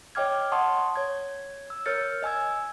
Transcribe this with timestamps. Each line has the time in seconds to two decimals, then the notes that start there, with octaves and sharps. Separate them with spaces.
0.15 C#5 D#5 G5 D6 F6 G#6
0.52 D#5 F#5 A5 C6 C#6 D#6
0.96 C#5 G#6
1.70 E6
1.86 A#4 C#5 F6 G6 A6 C#7
2.22 D#5 G#5 E6 G#6